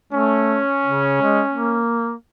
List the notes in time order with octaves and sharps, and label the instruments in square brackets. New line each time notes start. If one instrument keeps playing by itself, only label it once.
[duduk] A3 [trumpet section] C#4
[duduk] C#3
G#3
A#3